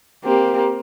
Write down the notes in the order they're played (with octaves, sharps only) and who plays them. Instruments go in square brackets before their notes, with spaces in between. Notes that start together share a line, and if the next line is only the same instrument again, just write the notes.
[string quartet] A#3 C4 [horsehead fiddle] G4